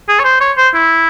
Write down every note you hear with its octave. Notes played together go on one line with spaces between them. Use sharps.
G#4
C#5
C5
C#5
C5
E4